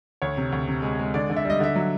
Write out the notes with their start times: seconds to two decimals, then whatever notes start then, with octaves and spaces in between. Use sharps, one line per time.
0.22 D2 C#5
0.37 C3
0.52 D2
0.68 C3
0.82 G#3
0.99 G#3
1.14 D3 D5
1.29 D3
1.36 E5
1.45 G3 D#5
1.60 D3 E5
1.75 F#3